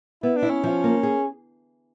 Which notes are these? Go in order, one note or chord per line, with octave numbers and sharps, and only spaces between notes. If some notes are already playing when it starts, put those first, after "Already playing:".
B3 E4
D4
E4
C#4
F3
A#3
G#4